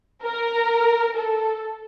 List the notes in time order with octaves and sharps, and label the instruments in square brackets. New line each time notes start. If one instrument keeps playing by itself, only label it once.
[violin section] A#4
A4